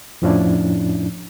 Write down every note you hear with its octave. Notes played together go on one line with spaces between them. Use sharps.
F2 A2 F3 C#4 D4 E4